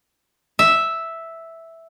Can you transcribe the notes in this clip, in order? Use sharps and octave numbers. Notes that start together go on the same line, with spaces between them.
E5